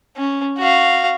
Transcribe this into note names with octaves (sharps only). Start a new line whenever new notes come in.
C#4
F#4 F5